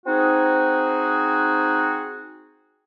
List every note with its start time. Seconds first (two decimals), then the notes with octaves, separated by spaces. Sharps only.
0.06 C4 D#4 F#4 G#4